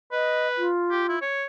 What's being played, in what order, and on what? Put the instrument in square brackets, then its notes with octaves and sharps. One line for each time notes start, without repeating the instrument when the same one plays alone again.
[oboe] B4 [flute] D#5
[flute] F4
[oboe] G4
E4
C#5